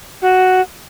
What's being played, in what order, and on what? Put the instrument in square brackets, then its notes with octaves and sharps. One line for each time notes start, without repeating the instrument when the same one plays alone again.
[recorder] F#4